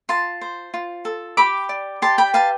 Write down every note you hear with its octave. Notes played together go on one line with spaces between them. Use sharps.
F4 A5 C6
C5
F4
A4
G4 B5 D6
D5
G4 A5 C6
G5 B5
B4 F5 A5